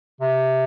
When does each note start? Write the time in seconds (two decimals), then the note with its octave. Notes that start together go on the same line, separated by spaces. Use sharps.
0.21 C3